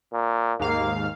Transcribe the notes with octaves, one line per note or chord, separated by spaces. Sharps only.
A#2
D#2 G#2 A#3 F5